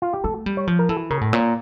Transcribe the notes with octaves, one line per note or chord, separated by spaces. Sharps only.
F4
G4
A3 A4
G3
C#5
F3
A#4
E3 A4
C#3 A#4
A2
A#2 C#5